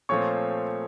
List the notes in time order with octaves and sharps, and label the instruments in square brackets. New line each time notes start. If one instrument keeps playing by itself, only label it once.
[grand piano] A#2 F3 A3 C4 C#5 C#6